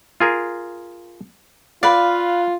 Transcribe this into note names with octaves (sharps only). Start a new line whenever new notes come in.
F4 G#4 A#4
F4 B4 D5 F5